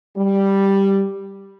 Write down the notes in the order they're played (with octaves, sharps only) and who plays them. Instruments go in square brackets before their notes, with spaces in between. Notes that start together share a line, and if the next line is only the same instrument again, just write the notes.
[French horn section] G3